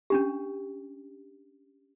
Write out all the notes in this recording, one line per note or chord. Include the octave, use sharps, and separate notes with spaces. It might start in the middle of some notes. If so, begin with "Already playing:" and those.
C#4 D4 G4